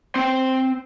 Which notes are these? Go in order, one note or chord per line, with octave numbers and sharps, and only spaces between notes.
C4 G5